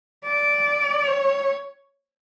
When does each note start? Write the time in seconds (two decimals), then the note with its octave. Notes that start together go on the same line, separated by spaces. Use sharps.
0.25 D5
1.07 C#5